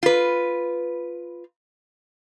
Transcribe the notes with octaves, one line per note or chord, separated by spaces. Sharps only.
F4 B4